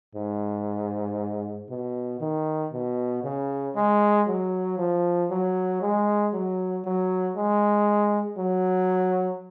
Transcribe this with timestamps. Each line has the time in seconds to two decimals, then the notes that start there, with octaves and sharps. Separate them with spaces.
0.15 G#2
1.70 B2
2.21 D#3
2.73 B2
3.24 C#3
3.76 G#3
4.27 F#3
4.78 F3
5.31 F#3
5.82 G#3
6.33 F#3
6.85 F#3
7.36 G#3
8.38 F#3